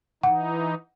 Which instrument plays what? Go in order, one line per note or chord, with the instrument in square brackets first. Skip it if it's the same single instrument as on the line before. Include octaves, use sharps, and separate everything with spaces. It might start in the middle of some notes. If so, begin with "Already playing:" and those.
[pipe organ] E3 D#4 [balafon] F#5